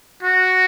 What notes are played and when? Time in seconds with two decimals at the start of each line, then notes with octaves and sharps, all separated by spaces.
0.23 F#4